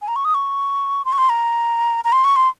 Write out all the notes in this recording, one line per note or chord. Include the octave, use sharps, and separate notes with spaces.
G#5
A#5
C#6
D#6
C#6
C6
C#6
C6
A#5
A#5
C6
C#6
C6